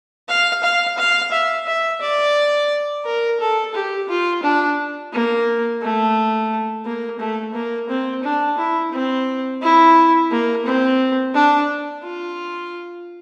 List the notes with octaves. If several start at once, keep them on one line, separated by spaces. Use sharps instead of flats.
F5
F5
F5
E5
E5
D5
A#4
A4
G4
F4
D4
A#3
A3
A#3
A3
A#3
C4
D4
E4
C4
E4
A#3
C4
D4
F4